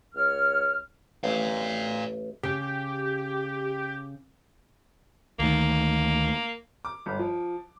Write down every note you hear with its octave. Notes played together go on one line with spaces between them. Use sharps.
C#2 C#5 F6
A1 D5 F5
C#3 G4
D2 D#3 A#3
D6
G1
F3